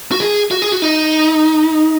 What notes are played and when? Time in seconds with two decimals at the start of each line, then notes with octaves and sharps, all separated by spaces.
0.12 F#4
0.20 G#4
0.51 F#4
0.62 G#4
0.72 F#4
0.82 D#4